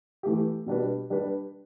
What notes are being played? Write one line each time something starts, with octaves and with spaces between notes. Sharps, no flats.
E3 A3 G4
B2 G3 D4 G4 B4
G3 D4 G4 B4